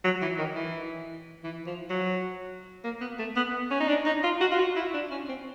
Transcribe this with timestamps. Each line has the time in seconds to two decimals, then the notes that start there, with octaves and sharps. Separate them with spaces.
0.04 F#3
0.22 E3
0.38 D#3
0.56 E3
1.44 E3
1.66 F3
1.90 F#3
2.84 A#3
3.01 B3
3.19 A3
3.36 B3
3.71 C#4
3.81 D#4
3.89 D4
4.06 D#4
4.24 F4
4.41 F#4
4.52 F4
4.59 F#4
4.76 E4
4.94 D4
5.11 C#4
5.29 C4